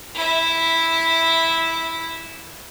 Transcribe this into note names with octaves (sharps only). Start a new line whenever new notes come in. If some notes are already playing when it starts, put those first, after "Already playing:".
E4 E5